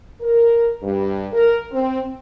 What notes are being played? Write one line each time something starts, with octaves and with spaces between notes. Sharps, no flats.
A#4
G2
A#4
C4